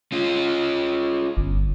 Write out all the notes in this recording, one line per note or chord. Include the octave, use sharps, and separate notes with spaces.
C#4 F4
G1